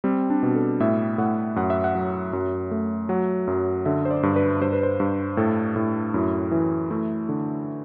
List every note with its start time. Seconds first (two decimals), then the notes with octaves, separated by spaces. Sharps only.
0.04 G3 C4
0.30 D4
0.43 B2
0.55 A4
0.80 A2 E5
1.18 A2 F#5
1.56 F#2 F#5
1.70 E5
1.84 F#5
1.95 F#3
2.33 F#2
2.71 A3
3.09 F#3 F#5
3.47 F#2
3.85 D3 E5
4.05 C5
4.11 D5
4.23 G2
4.36 B4
4.61 G2 C5
4.73 B4
4.83 C5
5.00 G2
5.37 A2 A4
5.76 A2
6.14 F#2 E4
6.52 E3
6.90 A3 E4
7.29 D3